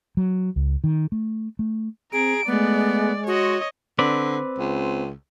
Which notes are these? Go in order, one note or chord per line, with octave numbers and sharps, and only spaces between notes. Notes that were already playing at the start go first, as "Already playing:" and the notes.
F#3
C#2
D#3
A3
A3
C4 G#4 A#5 D7
G#3 A3 B3 D5
F#4 C#5 D#5 C6
D3 C4 B4 D5
C#2